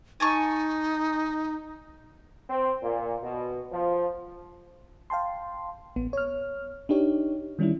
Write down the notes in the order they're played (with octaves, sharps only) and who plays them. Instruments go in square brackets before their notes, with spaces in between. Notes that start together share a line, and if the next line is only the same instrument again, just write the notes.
[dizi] D#4 [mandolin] G#5 A5 C#6
[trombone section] C4
A#2
B2
F3
[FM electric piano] F5 G5 A5 C6
A1 B3
C#5 F6
D4 D#4 G4 C#5
D#3 G3 C#4 D4 E4